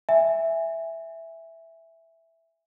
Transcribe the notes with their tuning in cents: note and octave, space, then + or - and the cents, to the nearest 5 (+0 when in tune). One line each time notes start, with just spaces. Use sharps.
E5 +0 G#5 -15